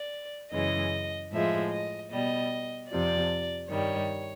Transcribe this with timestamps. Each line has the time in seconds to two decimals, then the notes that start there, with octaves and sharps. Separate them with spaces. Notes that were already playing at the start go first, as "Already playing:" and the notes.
Already playing: D5
0.52 F#2 C#3 E3 G#3 D#5
1.32 A2 F3 G#3 E5
1.72 D#5
2.12 B2 G3 D#5
2.91 F2 C3 F3 D5
3.70 G2 D#3 G3 C#5